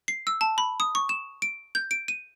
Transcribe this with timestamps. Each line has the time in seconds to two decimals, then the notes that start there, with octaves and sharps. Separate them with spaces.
0.08 C7
0.27 E6
0.41 A5
0.58 B5
0.80 D#6
0.95 C#6
1.09 E7
1.42 D7
1.75 G6
1.91 D7
2.08 D#7